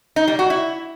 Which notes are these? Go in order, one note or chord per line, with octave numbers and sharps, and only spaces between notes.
D#4
G3
F#4
E4